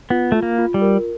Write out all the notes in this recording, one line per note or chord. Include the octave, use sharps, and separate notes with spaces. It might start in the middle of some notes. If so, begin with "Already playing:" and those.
B3 F4
A3 F4
A#3
F4
G3
A#4